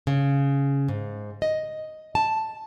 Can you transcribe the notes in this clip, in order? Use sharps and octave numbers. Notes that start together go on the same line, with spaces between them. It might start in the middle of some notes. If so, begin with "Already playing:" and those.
C#3
G#2
D#5
A5